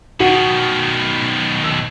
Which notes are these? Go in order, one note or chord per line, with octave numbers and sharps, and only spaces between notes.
B2 D#3 F#4
E6